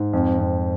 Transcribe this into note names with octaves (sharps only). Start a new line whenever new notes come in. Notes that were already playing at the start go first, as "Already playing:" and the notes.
Already playing: G#2
F2
F2